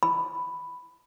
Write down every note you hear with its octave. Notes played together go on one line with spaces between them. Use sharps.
B5